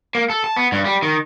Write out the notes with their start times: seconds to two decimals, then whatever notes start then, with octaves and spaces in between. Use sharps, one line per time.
0.15 A#3
0.30 A4
0.44 A5
0.57 B3
0.72 G2
0.85 G3
1.02 D#3